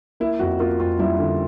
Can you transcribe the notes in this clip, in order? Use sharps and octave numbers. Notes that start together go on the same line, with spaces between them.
A#3 E4
F2 F#4
A#3 F4
F2 F4
G3 E4
D3